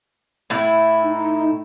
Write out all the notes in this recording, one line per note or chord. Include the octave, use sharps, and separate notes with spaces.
A2 E4
D#4